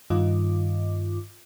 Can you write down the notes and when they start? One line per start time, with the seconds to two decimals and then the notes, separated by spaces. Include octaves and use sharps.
0.10 G2 D#3 F4 D#5 D6